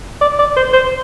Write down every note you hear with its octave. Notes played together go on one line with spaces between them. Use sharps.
D5
D5
C5
C5